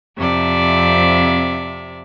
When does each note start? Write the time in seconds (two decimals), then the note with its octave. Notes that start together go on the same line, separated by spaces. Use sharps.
0.18 F2 C3 D5 E5